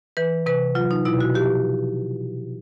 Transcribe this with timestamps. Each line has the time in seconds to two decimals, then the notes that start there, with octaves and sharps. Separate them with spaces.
0.17 E3 B4
0.46 C3 B4
0.75 F#3 F4
0.91 D#4
1.05 B2 E4
1.21 F#4
1.34 F3 G4